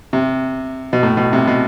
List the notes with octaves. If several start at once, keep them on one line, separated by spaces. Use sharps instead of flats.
C3
B2
A2
B2
C3
B2